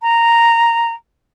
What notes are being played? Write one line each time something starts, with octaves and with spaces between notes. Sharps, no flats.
A#5